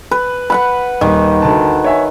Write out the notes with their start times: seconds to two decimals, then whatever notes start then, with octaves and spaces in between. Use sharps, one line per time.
0.11 B4
0.50 B4 F#5 B5
1.01 D#1 D#3
1.42 D2 A5
1.84 C#5 E5 G#5